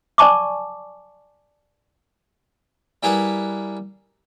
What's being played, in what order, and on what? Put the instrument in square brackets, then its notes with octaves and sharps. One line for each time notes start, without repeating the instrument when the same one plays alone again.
[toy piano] D5 G#5 A5 C#6 D6
[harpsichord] G3 E4 G#4 A#4 B4 F#5